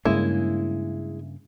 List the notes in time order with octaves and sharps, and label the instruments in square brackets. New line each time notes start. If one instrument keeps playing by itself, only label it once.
[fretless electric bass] G2 C#3 A#3 [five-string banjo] G#3 E4